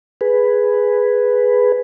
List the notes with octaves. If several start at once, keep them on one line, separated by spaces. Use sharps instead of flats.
G#4 B4